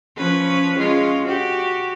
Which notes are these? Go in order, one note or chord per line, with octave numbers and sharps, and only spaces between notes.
F3 C#4 B4
G#3 C#4 F4
F#4 G4